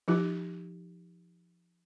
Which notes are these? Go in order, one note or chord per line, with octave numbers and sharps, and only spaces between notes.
F3 D#4 G4